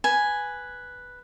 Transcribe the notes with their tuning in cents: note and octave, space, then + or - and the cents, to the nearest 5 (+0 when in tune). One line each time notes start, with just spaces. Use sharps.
B4 +0 G#5 +0